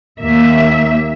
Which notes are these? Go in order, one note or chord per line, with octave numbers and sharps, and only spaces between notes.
D#2 A#3 E5